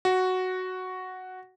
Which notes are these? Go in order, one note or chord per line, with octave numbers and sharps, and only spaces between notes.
F#4